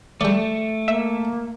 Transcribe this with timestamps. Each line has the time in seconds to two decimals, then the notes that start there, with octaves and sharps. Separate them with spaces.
0.21 G3 A3 D5
0.88 A#3 E5